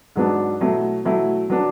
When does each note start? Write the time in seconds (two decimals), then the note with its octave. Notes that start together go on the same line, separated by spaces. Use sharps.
0.16 G#2 F#3 B3 D4
0.61 B2 F#3 A3 E4
1.05 B2 F#3 A3 E4
1.50 F#3 B3 D4